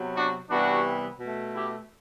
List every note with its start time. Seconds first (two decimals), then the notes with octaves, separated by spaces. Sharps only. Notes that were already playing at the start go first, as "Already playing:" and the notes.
Already playing: C3 F#3 B3
0.15 D4 F#4
0.49 C3 E3 G3 B3 D4 F#4
1.20 B2 A3
1.55 E4 G4